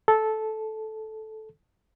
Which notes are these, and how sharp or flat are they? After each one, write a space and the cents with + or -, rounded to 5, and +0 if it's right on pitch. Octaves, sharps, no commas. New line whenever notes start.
A4 -10